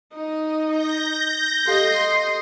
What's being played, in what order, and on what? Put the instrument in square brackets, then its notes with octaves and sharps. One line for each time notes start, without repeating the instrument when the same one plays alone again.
[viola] D#4 D#5
[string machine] G6 A#6
[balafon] G4 A4 F5 [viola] D#5 C6